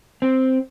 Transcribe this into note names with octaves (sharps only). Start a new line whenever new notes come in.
C4